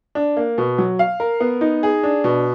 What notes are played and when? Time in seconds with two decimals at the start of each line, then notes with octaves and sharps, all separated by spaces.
0.15 D4
0.37 A#3
0.58 B2
0.78 F#3
0.99 F5
1.20 A#4
1.40 B3
1.61 D#4
1.83 G#4
2.03 D4
2.24 B2